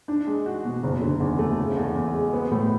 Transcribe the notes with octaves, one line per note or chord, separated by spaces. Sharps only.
D4
G#3
F#4
B2
F#1
D3
E2
A3
C#3
E2
E2
G#3
B3
A2